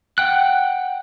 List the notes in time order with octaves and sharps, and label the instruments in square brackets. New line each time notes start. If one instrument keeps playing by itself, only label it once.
[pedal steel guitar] F#5 G5 F#6